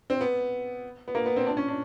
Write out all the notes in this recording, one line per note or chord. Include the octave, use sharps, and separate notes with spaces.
C4
B3
B3
A#3
B3
C4
D4
C#4
D4